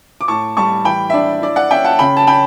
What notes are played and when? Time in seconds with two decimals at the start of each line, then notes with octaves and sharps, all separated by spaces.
0.21 D6
0.28 A2 A5 C#6
0.57 G3 A5 C#6
0.85 E3 G5 B5
1.10 E5
1.13 D4 D5
1.42 E4 D5
1.56 D5 F#5
1.71 C#4 E5 G5
1.85 F#5 A5
1.99 C#3 G5 B5
2.17 A5
2.27 C#4 G5 B5